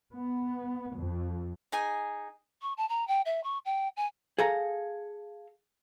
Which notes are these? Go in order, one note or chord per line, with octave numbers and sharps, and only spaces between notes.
B3
F2
D#4 G#4 G#5
C#6
A5
A#5
G5
E5
C#6
G5
G#5
G#4 A4 F5 A#5